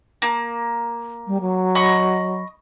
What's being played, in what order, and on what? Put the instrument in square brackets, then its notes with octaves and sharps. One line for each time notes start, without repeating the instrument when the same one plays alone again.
[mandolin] A#3
[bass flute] G3
F#3
[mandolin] D#5 B5 C#6